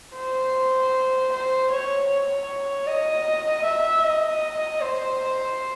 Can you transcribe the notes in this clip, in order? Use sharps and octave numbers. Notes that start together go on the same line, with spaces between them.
C5
C5
C#5
C#5
D#5
E5
D#5
C5